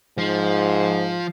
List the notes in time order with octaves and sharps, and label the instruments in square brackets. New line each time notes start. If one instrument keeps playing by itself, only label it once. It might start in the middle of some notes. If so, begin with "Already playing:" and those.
[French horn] G#2 [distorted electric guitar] F3